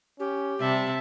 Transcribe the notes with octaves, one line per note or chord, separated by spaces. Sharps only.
C#4 G4
C3 G3 E5 A5